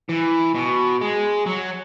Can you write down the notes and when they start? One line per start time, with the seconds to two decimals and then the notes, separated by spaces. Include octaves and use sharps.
0.09 E3
0.55 B2
1.01 G#3
1.46 F#3